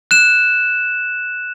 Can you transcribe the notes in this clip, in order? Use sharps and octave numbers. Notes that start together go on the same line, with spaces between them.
F#6 E7